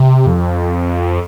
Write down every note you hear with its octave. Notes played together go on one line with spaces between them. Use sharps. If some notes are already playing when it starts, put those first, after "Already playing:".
Already playing: C3
F2